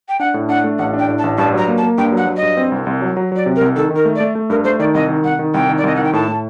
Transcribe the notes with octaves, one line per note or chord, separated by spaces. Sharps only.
G5
D4 F#5
A2
D4 F#5
A3
A1 F#5
D4
G5
A2
A5
A1
G2 A5
F#3 A#5
A#3
A5
A#3
G2 G5
F#3
F#5
F#3
D#5
G2
C4
C2
C2
F#3
F#3
F#3 D5
C3
A#4
C2
D#3 A4
D#3
A#4
A3
D5
A3
A3
G2 A#4
A3 C5
D#3 D5
C2 D#5
D#3
C2 F#5
D#3
C2 G5
D#3
D5
C2 D#5
D#3 F#5
G5
A2 A5
A2